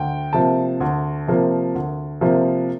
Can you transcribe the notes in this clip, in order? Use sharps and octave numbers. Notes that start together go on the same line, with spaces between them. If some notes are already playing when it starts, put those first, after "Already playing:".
Already playing: D2 G5
C3 F3 A#3 A5
D2
C3 F3 A#3
D2
C3 F3 A#3